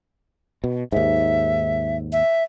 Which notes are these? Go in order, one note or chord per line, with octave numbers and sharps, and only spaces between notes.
B2
D#2 G#2 E5
E5